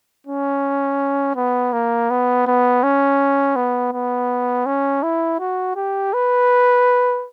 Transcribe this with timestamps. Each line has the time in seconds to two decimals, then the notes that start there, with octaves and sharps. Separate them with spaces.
0.27 C#4
1.36 B3
1.73 A#3
2.10 B3
2.47 B3
2.83 C#4
3.56 B3
3.93 B3
4.66 C#4
5.03 E4
5.40 F#4
5.76 G4
6.14 B4